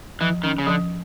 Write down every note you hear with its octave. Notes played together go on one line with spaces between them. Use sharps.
E3 F3
D#3 C#4
C#3
D3 F3